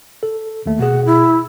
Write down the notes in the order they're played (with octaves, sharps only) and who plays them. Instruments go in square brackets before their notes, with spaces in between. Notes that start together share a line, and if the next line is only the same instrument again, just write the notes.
[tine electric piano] A4
D#2 A3
[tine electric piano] B2 G#4 [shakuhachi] F#5
[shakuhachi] E4